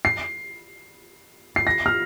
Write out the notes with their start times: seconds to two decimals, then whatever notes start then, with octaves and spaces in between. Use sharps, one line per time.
0.05 C7
1.56 C7
1.67 A#6
1.86 F6